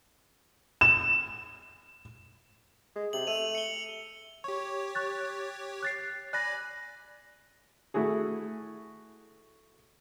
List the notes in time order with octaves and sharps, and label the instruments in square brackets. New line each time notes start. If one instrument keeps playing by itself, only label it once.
[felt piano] E7
[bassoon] G#3
[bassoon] C3 [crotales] F#7
[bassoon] A3 [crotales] E6 D#7 F7
[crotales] C#7 G7
[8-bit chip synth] G4 C#5 [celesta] C#6
[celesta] C#6 F#6 A6
F#6 A6 C7
[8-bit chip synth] D5 G#5 B5 [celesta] F#6 A#6
[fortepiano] A3 E4 F#4 G#4